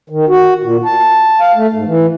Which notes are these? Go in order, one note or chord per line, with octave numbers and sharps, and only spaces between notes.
D#3
F#4
A#2
A5
F5
A3
G#2
E3